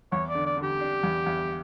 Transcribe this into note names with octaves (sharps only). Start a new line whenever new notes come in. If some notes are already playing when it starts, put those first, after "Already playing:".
E2 C#5
D5
D3
D5
D3
G4
D4
E2
E2